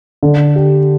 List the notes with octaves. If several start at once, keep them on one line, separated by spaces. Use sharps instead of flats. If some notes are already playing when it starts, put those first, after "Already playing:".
D3
G4